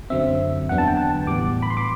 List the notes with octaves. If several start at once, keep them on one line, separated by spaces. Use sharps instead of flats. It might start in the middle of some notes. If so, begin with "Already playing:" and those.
F#2 D3 F#3 C4 E5
E2 D3 F#3 B3 D4 F#5
A5
G5
A5
A2 E3 G3 B3 D6
B5
C6
D6